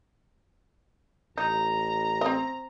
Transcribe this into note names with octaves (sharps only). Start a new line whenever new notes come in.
A1 D#4 A#5
C4 D#5